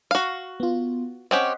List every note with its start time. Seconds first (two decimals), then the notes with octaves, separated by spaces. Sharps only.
0.11 F#4 F5
0.60 B3 F4
1.31 C4 C#4 G4 D#5 F#5 C6